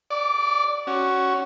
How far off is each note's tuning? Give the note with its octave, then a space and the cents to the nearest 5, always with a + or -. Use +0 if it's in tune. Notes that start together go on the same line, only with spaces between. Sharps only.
D5 +0 D6 -35
C#4 +0 F#4 +10